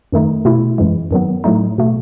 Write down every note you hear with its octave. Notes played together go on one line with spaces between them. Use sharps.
F#2 D#3 A3 D#4
B2 A3 E4
F#2 E3 G#3
F#2 D#3 F#3 B3
A2 F#3 A3 D#4
B2 A3